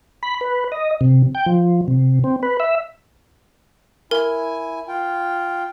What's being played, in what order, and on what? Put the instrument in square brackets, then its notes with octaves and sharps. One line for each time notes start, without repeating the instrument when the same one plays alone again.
[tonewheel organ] B5
B4
D#5
C3
G5
F3
C3
C4
B4
E5
[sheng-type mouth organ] E4 G#5 [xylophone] A#4
[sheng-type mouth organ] F4 G5